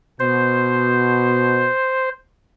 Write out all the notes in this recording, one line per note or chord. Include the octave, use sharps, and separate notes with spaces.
B2 C5